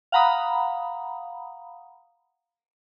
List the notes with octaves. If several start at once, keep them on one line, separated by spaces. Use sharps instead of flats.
F5 F#5 A#5 B5 D#6